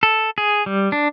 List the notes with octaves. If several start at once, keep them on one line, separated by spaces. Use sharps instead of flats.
A4
G#4
G3
D4